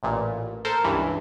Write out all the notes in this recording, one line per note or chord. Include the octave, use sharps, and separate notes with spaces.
A1 A#2
A4 A#4 C5
C#2 G2 E3